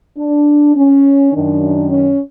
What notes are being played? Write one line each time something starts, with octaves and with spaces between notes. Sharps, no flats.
D4
C#4
F#2 D#3 D4
C#4